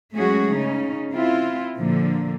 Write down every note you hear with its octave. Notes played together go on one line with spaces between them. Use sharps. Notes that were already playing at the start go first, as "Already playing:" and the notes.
F#3 G#3 A3 C#4 F#4 G#4
C#3 C#4 D#4
C4 E4 F4
A#2 D3 F3 A#3